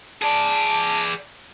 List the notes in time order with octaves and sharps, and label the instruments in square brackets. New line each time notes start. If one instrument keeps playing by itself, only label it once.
[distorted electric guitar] G#4 D5 [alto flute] A5